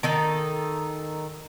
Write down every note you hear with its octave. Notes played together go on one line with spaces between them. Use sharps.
D#3 D#4 A4